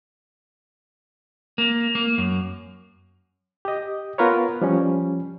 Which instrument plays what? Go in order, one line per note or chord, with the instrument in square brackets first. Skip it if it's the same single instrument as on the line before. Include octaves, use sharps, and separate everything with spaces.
[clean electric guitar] A#3
A#3
F#2
[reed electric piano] G4 D#5
B3 F4 A#4 B4 C#5
F3 G3 C#4